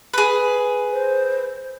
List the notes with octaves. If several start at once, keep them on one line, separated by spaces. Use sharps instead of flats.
G#4 B4
C5